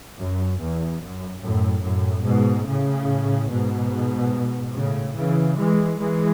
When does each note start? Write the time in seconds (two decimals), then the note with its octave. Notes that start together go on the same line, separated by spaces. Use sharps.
0.17 F#2
0.59 E2
1.00 F#2
1.41 F#2 A2
1.83 F#2 A2
2.24 G#2 B2
2.66 A2 C#3
3.49 G#2 B2
4.74 A2 C#3
5.15 C#3 E3
5.57 E3 G#3
5.99 E3 G#3